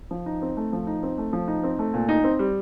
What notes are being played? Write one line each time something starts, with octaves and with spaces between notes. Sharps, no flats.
F3
D#4
C4
A3
F3
D#4
C4
A3
F3
D#4
C4
A3
A#2
D#4
C4
G3